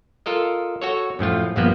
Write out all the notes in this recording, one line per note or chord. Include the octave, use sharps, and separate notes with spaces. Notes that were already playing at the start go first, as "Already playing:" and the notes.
F4 A4 A#4 D#5
F#4 A4 C#5
F#2 A2 F3 F4
A#1 G2 F3 A#3 B3 B4